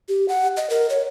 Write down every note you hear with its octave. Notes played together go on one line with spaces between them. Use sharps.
G4
F#5
D#5
A#4
C#5